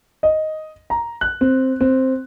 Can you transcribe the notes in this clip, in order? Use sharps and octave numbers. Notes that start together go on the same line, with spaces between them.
D#5
A#5
F#6
C4
C4